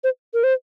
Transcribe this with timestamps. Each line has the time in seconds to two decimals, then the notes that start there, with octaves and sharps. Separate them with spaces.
0.04 C5
0.34 A#4
0.44 C5